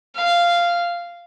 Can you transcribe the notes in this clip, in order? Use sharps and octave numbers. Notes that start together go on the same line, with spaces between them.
F5